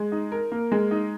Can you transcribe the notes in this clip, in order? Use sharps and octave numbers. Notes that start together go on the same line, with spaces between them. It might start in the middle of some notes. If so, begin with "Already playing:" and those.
Already playing: G#3
D#4
A#4
A#3
G#3
D#4